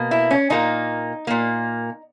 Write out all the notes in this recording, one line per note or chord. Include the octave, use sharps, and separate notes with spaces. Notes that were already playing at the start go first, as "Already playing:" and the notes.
Already playing: B2 A#3
E4
C#4
A#2 A#3 D#4
A#2 A#3